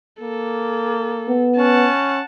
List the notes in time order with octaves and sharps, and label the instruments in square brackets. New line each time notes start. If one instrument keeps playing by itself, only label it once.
[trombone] A#3 [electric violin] A4
[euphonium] B3
[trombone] C#4 [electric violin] F#5 A5